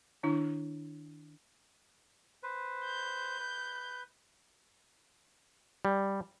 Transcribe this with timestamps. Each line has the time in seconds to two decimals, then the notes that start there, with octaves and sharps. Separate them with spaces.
0.23 D#3 D4 E4
2.43 B4 C5
2.85 G6
3.39 B4
5.85 G3